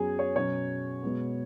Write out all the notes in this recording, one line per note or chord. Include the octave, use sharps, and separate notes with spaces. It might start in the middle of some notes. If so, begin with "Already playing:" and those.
Already playing: F#2 F#3 B3 G#4
C#5
B2 F#3 C#4 C#5
B2 G#3 B3